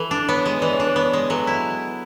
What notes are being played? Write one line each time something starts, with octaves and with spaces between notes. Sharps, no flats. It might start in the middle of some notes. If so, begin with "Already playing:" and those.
Already playing: E3 A4
D4
B3 C#5
G#3
E3 D5
C#5
D4
B4
B3 C#5
G#3
F#3 A4
E4